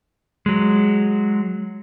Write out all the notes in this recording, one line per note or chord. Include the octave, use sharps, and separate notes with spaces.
F#3 G#3